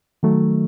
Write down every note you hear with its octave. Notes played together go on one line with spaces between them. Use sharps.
D#3 F#3 A3